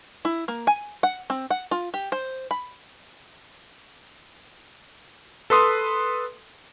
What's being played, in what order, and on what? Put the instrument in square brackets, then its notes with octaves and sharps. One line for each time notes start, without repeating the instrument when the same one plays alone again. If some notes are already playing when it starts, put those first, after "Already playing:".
[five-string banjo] E4
A#3
G#5
F#5
C4
F#5
F4
G4
C5
B5
[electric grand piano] A4 B4 C6 D#6